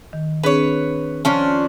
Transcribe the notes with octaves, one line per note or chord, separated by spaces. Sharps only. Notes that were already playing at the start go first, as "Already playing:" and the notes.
D#3
C4 D4 G#4 B4 C#5
F3 C#4 D4